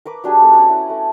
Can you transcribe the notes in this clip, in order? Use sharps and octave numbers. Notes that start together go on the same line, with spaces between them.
A#4 B4 D6
F#3 D4 G4 G#4
B3 A4
C#4 B4 F#5 A#5
E4
A3